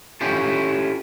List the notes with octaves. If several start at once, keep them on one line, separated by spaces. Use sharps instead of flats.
C#4 E4 F4 G4 A4